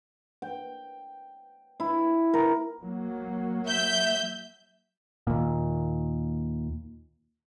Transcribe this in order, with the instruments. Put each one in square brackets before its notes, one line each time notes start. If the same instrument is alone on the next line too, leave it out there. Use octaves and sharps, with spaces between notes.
[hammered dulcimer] G5
E4
A#4
[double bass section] F#3 A#3
[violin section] E5 G6
[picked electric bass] D#2 A#2